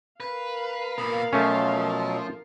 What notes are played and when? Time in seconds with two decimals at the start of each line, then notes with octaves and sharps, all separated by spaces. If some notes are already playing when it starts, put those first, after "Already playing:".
0.20 A#4 B4 F5
0.98 A#2 B3 B5
1.33 B2 F3 F#3 A3 C#4